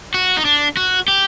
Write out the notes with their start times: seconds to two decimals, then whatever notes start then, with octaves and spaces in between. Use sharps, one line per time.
0.14 F#4
0.37 D#4
0.45 D4
0.77 F#4
1.08 G4